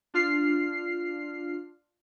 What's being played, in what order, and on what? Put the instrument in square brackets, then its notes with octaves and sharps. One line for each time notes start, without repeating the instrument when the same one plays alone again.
[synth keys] D4 F4 F6 C7